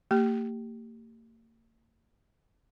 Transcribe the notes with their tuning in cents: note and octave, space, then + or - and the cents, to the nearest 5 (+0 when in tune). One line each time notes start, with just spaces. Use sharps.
A#3 -40 G4 +0